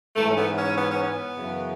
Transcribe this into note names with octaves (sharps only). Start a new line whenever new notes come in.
G#2 E3 A3
C#4
B3
C#4
B3
C#4
B3
F#2 C#3 E3